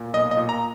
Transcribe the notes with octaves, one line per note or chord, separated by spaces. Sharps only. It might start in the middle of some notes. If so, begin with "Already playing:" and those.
Already playing: A#2
B1 D#5
D#5
A#2
A#5